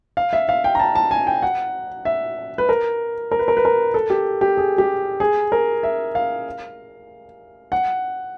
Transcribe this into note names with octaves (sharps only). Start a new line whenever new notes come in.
F5
E5
F5
G5
A#5
A5
A5
G#5
G5
F#5
E5
B4
A#4
A#4
B4
A#4
B4
A#4
A4
G4
G4
G#4
G4
G#4
A#4
E5
F5
F#5